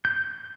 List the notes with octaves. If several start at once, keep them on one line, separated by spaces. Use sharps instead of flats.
G6